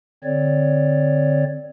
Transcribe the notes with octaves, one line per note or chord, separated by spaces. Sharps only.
D3 C4 C#5 D5